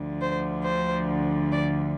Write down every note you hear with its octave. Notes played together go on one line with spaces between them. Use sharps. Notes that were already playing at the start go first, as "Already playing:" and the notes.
Already playing: D2 D3 F3
C5
C5
D5